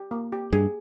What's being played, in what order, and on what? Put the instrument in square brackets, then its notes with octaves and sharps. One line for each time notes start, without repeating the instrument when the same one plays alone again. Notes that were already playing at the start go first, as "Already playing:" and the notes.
Already playing: [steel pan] G4
A#3
G4
[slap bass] G2 [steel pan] G#4